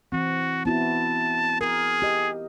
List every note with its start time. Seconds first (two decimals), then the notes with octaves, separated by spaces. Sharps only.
0.12 E3 C4 F#4
0.66 B3 E4 F#4 A5
1.61 G#4 A#4
2.02 G4 D#5